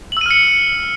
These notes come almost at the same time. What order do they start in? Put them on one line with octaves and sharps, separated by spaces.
F#7 E6 D#7 F6 C#7